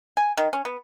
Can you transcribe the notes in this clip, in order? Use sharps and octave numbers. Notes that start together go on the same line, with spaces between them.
G#5
D#3
C#4
B3